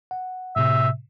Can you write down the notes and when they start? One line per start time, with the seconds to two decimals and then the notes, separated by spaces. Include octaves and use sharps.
0.11 F#5
0.56 A2 C3 E5